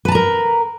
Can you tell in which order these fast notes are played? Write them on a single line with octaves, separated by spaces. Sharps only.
B4 A5 A#5 A#4